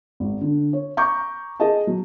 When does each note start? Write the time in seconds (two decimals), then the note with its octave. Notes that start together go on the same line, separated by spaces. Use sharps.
0.20 G#1
0.41 D3
0.73 C#5
0.97 A#5 C#6 D6 G6
1.60 G#4 D#5 A5
1.87 F#3